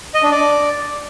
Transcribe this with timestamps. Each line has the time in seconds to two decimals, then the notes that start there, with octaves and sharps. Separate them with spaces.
0.14 D#5
0.23 D4
0.31 D5